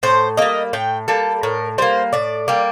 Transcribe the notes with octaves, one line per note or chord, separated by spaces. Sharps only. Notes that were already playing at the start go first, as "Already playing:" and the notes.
A2 C5
G3 A#3 D#5
A2 G5
G3 A#3 A4
A2 A#4
G3 A#3 C5
A2 D5
G3 A#3